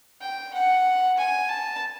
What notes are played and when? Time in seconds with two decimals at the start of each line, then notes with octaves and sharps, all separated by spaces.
0.21 G5
0.54 F#5
1.18 G#5
1.49 A5